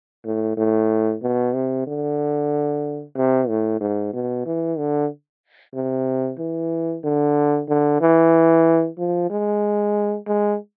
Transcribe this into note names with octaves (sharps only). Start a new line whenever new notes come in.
A2
A2
B2
C3
D3
C3
A2
G#2
B2
E3
D3
C3
E3
D3
D3
E3
F3
G#3
G#3